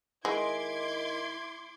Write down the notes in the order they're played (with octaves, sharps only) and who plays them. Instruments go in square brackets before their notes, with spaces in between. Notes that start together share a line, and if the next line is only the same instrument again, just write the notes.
[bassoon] D#3 [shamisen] G#3 [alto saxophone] E4 [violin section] C6 D6 G#6